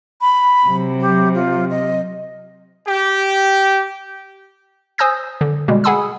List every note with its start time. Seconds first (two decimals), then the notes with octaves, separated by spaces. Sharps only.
0.21 B5
0.65 C3 F#3
1.01 G4
1.35 F4
1.70 D#5
2.88 G4
4.98 C5 G#5 D#6 E6 G6 A#6
5.41 D3
5.68 B2 G3 G#3
5.84 G#4 F#5 G#5 B5 D#6 E6